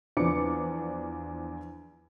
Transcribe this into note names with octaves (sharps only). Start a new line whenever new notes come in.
E2 F3 D4 D6 C#7